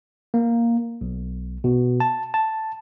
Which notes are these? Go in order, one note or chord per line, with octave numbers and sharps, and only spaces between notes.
A#3
B1
B2
A5
A5